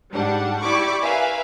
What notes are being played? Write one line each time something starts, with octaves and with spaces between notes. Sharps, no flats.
G#2 G3 D4 F#5
E4 G4 D5 B5 C#6 D6
A#4 B4 E5 F5 G#5